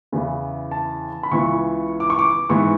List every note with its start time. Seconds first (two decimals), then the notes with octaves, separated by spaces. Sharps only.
0.12 E2 C#3 E3 B3
0.71 A5
1.23 B5
1.31 C#2 C#3 E3 B3 C#6
2.00 D6
2.10 C#6
2.19 D6
2.49 G#2 E3 B3 C#6